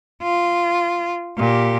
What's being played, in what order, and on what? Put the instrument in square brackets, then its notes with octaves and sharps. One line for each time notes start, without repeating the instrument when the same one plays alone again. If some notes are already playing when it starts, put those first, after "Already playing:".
[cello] F4
A#2 G4